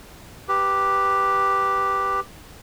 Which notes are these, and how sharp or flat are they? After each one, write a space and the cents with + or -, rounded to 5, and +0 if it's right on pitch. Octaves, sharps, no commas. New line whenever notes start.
G4 +0 B4 +0